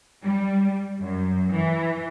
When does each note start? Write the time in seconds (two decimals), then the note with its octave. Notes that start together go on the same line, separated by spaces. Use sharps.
0.23 G3
1.00 F#2
1.50 E3